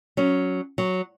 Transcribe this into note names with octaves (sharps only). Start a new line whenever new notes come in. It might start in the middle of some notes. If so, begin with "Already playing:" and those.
F#3 C#4
F#3